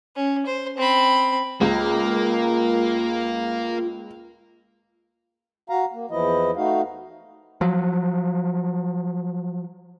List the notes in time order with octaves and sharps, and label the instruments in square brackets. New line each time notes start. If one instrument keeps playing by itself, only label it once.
[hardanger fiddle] C#4
C5
C4 B5
[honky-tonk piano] C#2 [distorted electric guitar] A#3 [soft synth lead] F4
[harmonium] F#4 F5 A#5
A#3
E2 E3 F3 E4 D#5
A3 D#4 F#4 F5
[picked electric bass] F3 F#3